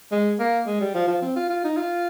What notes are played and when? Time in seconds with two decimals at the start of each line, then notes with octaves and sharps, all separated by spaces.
0.12 G#3
0.39 A#3
0.66 G#3
0.81 G3
0.94 F3
1.07 F3
1.22 C4
1.36 F4
1.49 F4
1.64 D#4
1.77 F4